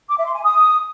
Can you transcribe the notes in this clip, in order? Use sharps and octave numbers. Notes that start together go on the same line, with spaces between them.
D6
E5
C6
G#5
D#6